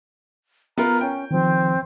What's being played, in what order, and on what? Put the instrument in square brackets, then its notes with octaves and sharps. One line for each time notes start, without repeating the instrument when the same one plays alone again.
[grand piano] B3 F4 A#4 [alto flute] A#5
[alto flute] C#4 [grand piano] G5
[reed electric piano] D#3 F3 [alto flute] C4